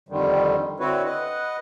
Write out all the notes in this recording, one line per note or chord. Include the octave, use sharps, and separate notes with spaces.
F2 D3 D#3 G3
D3 C4 E4 F#4 B4 C#5
B4 D#5 F#5